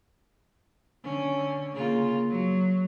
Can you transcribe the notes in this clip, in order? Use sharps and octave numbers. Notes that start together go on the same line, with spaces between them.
D3 C#4
C#3 A#3 F4
F#3